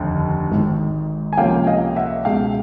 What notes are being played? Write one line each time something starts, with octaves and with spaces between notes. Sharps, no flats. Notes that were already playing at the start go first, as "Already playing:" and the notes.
Already playing: F1 D#2 D3
G#1 G#2 D#3
G#5
C#2 C3 F3 A#3 C#4 F5 G5
D#5 F5
E5 F#5
C#2 B2 G#3 F5 G5